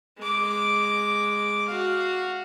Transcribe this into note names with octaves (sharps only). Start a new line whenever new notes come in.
G#3 D6
F#4 F5